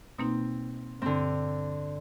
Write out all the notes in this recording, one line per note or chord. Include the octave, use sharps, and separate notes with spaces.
B2 A#3 C4 D#4
G2 D3 C4